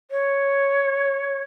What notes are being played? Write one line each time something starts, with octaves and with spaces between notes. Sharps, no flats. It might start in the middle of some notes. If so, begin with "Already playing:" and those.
C#5